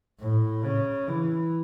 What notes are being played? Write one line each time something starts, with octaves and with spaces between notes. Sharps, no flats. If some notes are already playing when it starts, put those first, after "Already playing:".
A2
C#3
E3